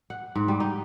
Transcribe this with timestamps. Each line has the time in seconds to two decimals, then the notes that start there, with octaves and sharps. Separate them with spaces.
0.10 F#5
0.35 G#2
0.48 G3
0.60 D#4